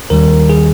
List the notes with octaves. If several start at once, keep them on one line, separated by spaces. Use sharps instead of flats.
D#2 D#3 G3 A#4
G#4